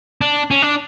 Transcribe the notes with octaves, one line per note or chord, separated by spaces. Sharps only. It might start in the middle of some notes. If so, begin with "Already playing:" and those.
D4
C#4
D4